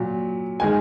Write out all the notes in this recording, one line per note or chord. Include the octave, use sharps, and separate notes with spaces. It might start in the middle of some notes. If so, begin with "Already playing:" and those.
Already playing: A#2 F#3
D#3 G#3 G#5